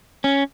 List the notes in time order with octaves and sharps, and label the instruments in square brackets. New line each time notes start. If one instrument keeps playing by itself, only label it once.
[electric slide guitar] C#4